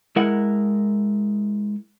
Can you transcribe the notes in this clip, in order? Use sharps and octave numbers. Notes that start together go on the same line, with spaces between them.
G#3 E4 A#4 F#5